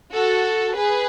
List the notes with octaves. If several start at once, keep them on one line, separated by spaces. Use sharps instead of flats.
F#4 A4
G#4 B4